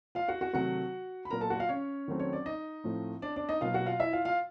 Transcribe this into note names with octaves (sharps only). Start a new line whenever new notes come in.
F4 F5
F#4 F#5
F#4 F#5
C3 D#3 F#3 A3 F#4 F#5
B5
A#2 F#3 B3 A#4 A#5
A4 A5
F#4 F#5
F4 F5
C#4 C#5
D#3 F#3 A3 C4
C#5
D5
D#4 D#5
A2 F3 A3 C4
D4 D5
D4 D5
D#4 D#5
B2 F#3 A#3 F4 F5
F#4 F#5
F4 F5
E4 E5
F4 F5
F4 F5